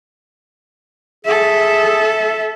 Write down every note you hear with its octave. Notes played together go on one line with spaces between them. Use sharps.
G#4 A4 E5